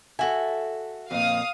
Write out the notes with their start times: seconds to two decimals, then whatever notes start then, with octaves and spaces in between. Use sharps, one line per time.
0.19 F#4 A4 E5 G#5
1.11 F2 A#2 F5 D#6